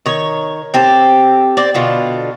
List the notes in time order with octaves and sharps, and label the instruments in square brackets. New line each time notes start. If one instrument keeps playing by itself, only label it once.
[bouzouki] D#3 C#5
C4 G4 A4
C4 D5
B2 D3 F4